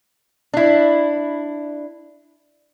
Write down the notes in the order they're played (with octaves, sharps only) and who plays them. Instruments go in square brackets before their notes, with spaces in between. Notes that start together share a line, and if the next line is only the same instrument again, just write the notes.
[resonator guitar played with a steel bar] D4 E4